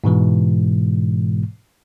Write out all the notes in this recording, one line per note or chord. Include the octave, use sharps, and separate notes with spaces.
G#2 B2 E3 G#3